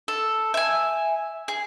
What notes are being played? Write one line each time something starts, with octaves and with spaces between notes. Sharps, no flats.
A4
E5 G#5
G#4